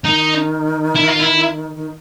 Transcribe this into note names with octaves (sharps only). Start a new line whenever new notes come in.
D#3 D#4
E4
F4
E4
D#3